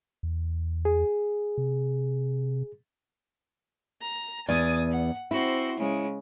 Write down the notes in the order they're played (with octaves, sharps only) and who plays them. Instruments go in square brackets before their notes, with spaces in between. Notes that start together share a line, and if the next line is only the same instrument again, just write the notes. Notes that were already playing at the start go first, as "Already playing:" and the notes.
[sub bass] E2
[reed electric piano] G#4
[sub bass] C3
[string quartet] A#5
[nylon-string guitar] E2 D5 [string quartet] G#5 D#6 A6
[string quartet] F#5
[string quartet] C4 F#4 C5 [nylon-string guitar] E4
[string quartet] C#3 G#3